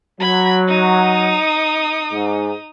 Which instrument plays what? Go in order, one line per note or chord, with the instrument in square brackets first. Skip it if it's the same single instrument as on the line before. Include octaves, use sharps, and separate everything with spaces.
[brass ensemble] F#3 [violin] B5 G#6
[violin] D#4 D#6
[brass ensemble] G#2